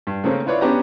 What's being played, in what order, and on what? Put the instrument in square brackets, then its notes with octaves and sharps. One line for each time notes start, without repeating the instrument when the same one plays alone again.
[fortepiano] G2
C#3 A3 A#3 C4 C#4
E4 F4 B4 C#5 D5
B3 C#4 D4 G4 B4 A#5